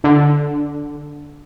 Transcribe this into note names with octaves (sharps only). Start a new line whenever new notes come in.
D3